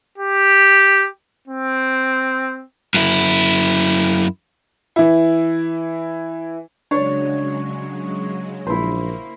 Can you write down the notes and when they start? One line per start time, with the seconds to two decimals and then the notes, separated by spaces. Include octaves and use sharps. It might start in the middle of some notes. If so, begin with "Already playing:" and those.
0.18 G4
1.48 C4
2.94 F#2 E4
4.96 E3 E4
6.91 C#3 F#3 G#3 D4 C#5
8.67 A#1 A#3 E4 C5